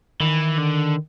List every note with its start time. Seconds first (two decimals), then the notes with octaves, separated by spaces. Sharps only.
0.20 D#3 E3
0.58 D3